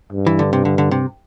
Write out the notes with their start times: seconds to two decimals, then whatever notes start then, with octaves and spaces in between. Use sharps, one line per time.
0.13 G2
0.27 E3
0.39 D3
0.53 C3
0.65 D3
0.78 D3
0.91 C3